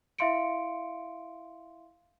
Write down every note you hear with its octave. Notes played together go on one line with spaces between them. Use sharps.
E4 E5 F5 C6 C#7 D7